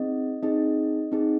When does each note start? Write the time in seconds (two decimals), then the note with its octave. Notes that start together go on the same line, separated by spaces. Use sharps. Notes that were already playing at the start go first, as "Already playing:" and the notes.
Already playing: C4 D#4 G#4 D#5
0.42 C4 D#4 G#4 D#5
1.12 C4 D#4 G#4